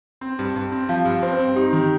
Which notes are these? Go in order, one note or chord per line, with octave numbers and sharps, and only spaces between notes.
C4
G2
G2
C4
F3 F5
G2
C4 C5
C4
D#4 G4
D#3